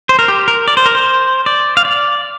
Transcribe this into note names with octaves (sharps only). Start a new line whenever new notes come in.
C5
A#4
G4
A#4
D5
C5
A#4
C5
D5
F5
D5